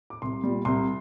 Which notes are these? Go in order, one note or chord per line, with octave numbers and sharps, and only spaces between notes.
D6
C2 C6
A#2 G3
C2 C6